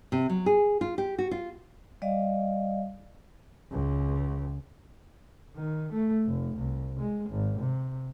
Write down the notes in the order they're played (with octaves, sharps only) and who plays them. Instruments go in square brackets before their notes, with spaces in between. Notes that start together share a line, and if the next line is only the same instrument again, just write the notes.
[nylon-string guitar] C3
F#3
G#4
F4
G4
F#4
F4
[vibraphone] G3 D5 D#5 F5
[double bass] C#2
D#3
A3
F1
C2
G#3
G#1
C3